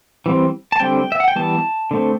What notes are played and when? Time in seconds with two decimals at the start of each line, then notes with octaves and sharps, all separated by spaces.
0.26 E3 G3 C4
0.72 A5
0.80 D3 G3 C4 G5
1.12 E5
1.20 F#5
1.28 G5
1.36 E3 G3 B3 A5
1.91 D3 A3 C4